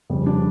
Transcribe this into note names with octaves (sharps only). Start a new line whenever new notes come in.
F1 F2 C#3 G3
D4